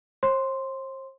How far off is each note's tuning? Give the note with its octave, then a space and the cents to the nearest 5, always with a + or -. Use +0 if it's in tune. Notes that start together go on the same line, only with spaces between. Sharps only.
C5 +40 C6 +0